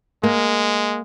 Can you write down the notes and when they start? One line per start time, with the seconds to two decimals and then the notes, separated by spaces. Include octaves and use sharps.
0.23 G#3 A#3